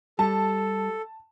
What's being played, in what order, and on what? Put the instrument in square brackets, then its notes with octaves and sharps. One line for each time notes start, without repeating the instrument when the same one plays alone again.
[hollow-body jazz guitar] G3 [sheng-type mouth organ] A4 [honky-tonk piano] A5